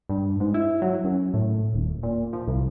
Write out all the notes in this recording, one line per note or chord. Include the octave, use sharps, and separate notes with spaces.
G2
G#2
E4
F#3
F#2
A2
D#1
A#2
F3
C2